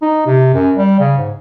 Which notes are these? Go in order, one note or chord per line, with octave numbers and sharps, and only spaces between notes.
D#4
C3
F#2
G3
C#3
G#2